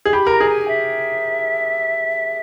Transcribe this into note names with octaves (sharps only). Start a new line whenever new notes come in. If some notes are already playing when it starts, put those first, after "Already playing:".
G#4
G4 B5
A#4 A#5
G#4
G#5
E5